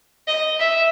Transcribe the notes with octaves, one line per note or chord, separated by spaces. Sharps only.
D#5
E5